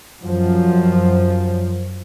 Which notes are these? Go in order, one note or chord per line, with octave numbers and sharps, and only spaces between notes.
F#2 F3